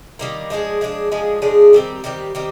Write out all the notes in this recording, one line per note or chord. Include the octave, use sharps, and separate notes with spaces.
D#3 G3 A#3
F3 G#3 D4 G#4
F3 G#3 D4 G#4
F3 G#3 D4 G#4
F3 G#3 D4 G#4
D#3 G3 C4 G4
D#3 G3 C4 G4
D#3 G3 C4 G4